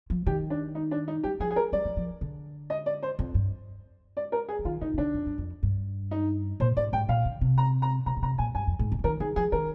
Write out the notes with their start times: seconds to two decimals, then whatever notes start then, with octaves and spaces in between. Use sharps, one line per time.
0.10 F3
0.26 D#3 G4
0.50 D4
0.75 D#4
0.91 D4
1.08 D#4
1.23 G3 G4
1.40 F3 G#4
1.51 G#4
1.56 A#4
1.72 G3 D5
1.85 F3
1.97 F3
2.21 D3
2.70 D#5
2.86 D5
3.03 C5
3.19 F2
3.34 G2
4.17 D5
4.32 A#4
4.49 G#4
4.59 F3
4.65 D#3 F4
4.81 D3 D#4
4.94 C3
4.98 D3 D4
5.14 F2
5.26 G2
5.38 F2
5.63 G2
6.11 D#4
6.60 A#2 C5
6.77 G#2 D5
6.93 G#2 G5
7.09 A#2 F5
7.25 D3
7.41 C3
7.58 A#5
7.82 A#5
8.06 C3 A#5
8.17 A#2
8.22 C3 A#5
8.38 A#2 G#5
8.55 G2 G#5
8.67 F2
8.79 G#2
8.92 D3
8.99 F3
9.04 D#3 A#4
9.20 D#3 G#4
9.36 F3 G#4
9.52 D#3 A#4